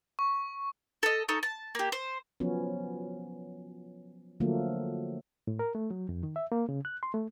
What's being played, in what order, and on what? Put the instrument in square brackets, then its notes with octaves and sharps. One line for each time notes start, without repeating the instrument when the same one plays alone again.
[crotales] C#6
[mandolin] A4 D#5
D#4 A4 C#5
A5
A#3 G4
C5
[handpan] F3 F#3 B3 C#4
D3 F3 F#3 A3 A#3
[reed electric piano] A2
A#4
A3
F#3
F2
D#3
E5
A#3
C#3
F#6
C6
A3